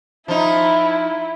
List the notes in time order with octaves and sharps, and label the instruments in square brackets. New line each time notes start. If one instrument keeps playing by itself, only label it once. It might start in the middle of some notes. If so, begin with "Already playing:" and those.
[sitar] F3 D#4 [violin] E4